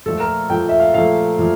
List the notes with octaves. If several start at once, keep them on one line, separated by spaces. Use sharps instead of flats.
A#2 F3 A3 A4
A#4
A#2 F3 A3 G5
E5
F5
A#2 F3 A3 F5
A#2 F3